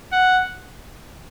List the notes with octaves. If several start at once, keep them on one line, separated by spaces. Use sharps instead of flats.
F#5